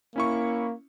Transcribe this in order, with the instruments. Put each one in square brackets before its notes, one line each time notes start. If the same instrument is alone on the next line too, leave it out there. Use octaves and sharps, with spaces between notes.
[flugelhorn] A#3 [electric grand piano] C#4 E4 C#6